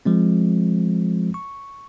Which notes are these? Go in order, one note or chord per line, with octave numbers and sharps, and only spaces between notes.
F3 G#3 C4
C#6